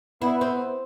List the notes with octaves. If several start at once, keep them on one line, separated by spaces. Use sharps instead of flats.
B3 E4
C4